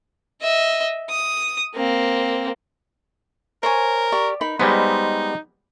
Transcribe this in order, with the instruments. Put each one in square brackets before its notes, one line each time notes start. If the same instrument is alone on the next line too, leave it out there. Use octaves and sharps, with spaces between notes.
[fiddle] D#5 E5
D#6
A#3 C4
[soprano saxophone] A#4 [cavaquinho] C5 C#5 G#5
[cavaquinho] G4 D5 C#6
D#4 A#4 B5
[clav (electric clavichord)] G3 G#3 B3 [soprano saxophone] D#4 [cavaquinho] C5